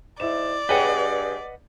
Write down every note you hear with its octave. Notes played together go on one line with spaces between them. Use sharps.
G#2 E4 D5 E7
G2 G#4 B4 C#5 D#5 F#5 G5